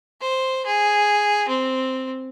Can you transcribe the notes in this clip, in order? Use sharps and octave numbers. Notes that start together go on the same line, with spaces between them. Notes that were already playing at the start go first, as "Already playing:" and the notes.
C5
G#4
C4